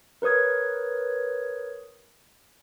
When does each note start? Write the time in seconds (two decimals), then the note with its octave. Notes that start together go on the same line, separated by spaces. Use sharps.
0.22 A#4 B4 C#5 D#6 G#6